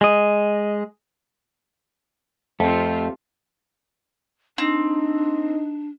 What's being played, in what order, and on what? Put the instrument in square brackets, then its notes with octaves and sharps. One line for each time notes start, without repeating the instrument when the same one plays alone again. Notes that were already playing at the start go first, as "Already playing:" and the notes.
[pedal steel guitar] G#3 D#5
[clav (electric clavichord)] F2 [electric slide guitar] A3 [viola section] C4 F4 G4
[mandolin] C4 [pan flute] D4 [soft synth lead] D#4